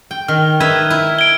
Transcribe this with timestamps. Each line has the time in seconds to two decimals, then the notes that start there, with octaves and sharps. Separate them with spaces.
0.11 G5
0.28 D#3 F6
0.60 D#4 B4 E5 G#6
0.90 E4
1.19 D7 G7